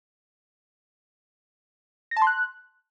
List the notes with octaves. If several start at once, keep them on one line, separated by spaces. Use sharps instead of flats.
A#6
A5
C6
F#6